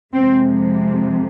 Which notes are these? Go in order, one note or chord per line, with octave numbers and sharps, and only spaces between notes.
F2 C3 F3 G#3 C4